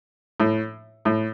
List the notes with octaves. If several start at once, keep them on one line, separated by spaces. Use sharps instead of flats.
A2
A2